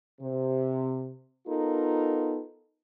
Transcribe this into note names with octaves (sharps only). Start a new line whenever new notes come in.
C3
B3 D#4 F4 A4 A#4